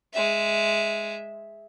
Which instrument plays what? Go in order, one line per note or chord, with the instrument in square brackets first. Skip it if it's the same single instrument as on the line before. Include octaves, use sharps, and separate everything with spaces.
[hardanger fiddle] G#3 E5